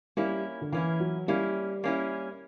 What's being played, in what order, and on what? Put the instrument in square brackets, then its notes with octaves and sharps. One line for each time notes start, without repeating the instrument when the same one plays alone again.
[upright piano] G3 [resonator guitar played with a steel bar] A#3 C#4 E4
[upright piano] D3
[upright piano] E3 [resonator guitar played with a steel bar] A#3 C#4 E4
[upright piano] F#3
[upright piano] G3 [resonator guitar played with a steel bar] A#3 C#4 E4
[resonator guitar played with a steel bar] A#3 C#4 E4